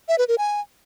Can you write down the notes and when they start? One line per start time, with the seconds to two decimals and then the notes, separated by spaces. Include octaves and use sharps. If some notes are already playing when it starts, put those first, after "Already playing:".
0.08 E5
0.18 B4
0.28 A#4
0.38 G#5